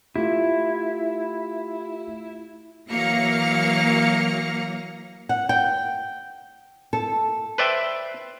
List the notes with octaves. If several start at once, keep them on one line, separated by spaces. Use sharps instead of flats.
A3 E4 F4 G4
E3 F#3 A#3 F5 A#6 C#7
F#5
G5
A4
B4 C5 D5 E5 G5